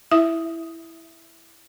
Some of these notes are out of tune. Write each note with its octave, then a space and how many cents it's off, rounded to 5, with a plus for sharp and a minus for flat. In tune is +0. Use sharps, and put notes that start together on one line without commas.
E4 +0 E5 +0 D#6 +0